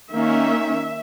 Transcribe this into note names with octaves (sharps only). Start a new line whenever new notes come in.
D#3 A#3 C#4 E5